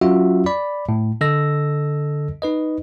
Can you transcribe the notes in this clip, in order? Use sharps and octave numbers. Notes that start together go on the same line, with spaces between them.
F#3 C#4 F4 F#4 E5
D5 B5
A2
D3 A4 D#5 E6 A#6
D#4 B4 D#5